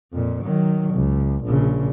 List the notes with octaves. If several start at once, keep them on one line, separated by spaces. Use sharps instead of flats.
F2 A#2
D#3 F#3
C#2
A#1 C#3